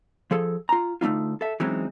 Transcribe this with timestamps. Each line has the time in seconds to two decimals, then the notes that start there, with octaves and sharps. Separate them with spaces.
0.31 F3 G#4 A4
0.69 F4 A#5
1.01 D2 A3 A#3 D#4 F4
1.41 A4 E5
1.60 E3 F#3 G#3 C4 C#4 D#4